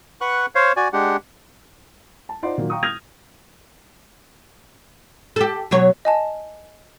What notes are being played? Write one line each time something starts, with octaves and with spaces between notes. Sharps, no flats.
B4 F#5 C#6 F#6
C5 C#5 F5
F#4 D5 G#5
G#3 D4 G4 F#5
A5
D#4 F4 C5 D5 F#5 C6
A#2 D#3 F#3
F5 G5 A#5 C#6 D#6
D#6 F6 G6 G#6 A#6 F7
G4 A4
B2 F#3 C#5
D#5 G#5 A5